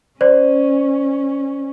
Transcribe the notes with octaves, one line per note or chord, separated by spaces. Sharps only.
C#4 C5 D5